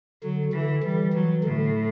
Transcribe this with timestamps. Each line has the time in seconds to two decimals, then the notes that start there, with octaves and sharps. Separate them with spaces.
0.23 D3 F#3
0.53 D3 E3
0.83 E3 G3
1.13 E3 F#3
1.44 A2 D3